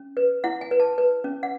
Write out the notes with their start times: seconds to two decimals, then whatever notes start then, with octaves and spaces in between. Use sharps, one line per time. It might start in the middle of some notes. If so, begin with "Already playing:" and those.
Already playing: C#4
0.17 B4
0.44 E4 F#5
0.61 G#5
0.71 B4
0.80 A5
0.98 B4
1.24 C#4
1.43 F#5